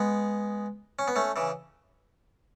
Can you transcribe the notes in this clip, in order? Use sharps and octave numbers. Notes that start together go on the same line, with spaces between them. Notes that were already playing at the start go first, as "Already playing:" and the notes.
Already playing: G#3 B3
C#4
B3
A3 C#4
C#3 E3